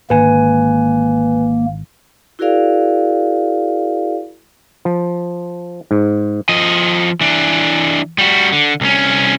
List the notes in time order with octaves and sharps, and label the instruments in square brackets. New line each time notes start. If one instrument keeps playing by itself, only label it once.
[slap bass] G#1 G#2 D3 [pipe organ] A#3 [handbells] B4 G#5
[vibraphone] E4 F#4 G#4 A#4 D5 F5
[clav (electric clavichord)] F3
G#2
[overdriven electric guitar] F3 D#5
E3 D4
G3 F#4
D3
C2 C#4